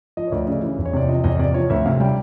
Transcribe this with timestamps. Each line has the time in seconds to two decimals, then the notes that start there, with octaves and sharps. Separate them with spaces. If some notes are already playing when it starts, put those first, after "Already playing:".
0.17 F3 D#5
0.27 C#5
0.32 D2 D5
0.47 C#3 D5
0.63 E3
0.78 E2
0.85 C#5
0.93 C3 D5
1.08 F3 D#5
1.24 E2 D#5
1.39 C3 D5
1.54 F3 C#5
1.70 D2 E5
1.86 C3 F5
2.00 G3 G5